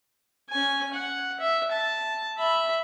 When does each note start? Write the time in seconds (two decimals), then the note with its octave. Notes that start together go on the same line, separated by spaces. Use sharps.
0.49 C#4 G#5
0.93 F#5
1.40 E5
1.72 A5
2.38 E5 B5